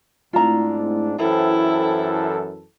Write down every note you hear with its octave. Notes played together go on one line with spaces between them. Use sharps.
G#2 A3 C4 D4 E4 F4 A#5
F#2 E3 E4 A4 C5 G5